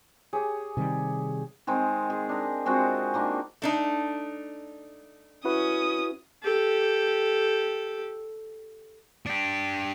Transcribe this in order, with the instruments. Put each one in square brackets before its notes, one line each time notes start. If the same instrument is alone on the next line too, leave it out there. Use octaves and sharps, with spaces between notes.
[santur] G4 G#4 C#5
[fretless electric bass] C3 D#3 G3
[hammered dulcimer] D#3 G#3 C4
G#4
D4 A#4
G#3 C4 F4 F#4
D#3 A#3 D4
[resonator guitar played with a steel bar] A3 D4 D#4
[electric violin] C#4 D#6 [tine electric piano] E4 F#4 B4
[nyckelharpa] G4 A4
[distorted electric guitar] D4 G4